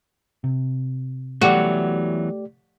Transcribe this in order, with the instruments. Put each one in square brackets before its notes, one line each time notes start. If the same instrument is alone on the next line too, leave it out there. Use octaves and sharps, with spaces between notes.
[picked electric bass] C3
[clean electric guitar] E2 E3 F#3 [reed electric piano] A3 G4 D5 [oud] F#4